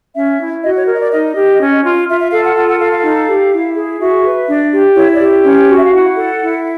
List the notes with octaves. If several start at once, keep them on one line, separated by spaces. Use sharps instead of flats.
C#4 E5
E4
F#4 D#5
C#5
A#4
D#5
D5
D#4 D#5
G4
C#4
F4
F4 E5
E5
A4 F5
F#5
F4 F#5
F#5
A4 F5
F5
D#4
G4
E4
G#4
F#4 E5
B4
D4
G4
E4 C#5
D5
G4
C#4
F#4
E5
F5
E4 F#5
A4
E4